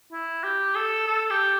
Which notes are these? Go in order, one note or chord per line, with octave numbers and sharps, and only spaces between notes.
E4
G4
A4
A4
G4